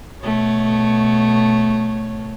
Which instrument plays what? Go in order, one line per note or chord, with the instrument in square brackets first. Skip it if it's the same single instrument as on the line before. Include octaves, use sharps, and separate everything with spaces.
[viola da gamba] B2 A3 C#5